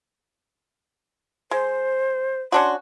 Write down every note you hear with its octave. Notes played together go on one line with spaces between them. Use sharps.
G#3 C5
C#4 D4 F#4 C6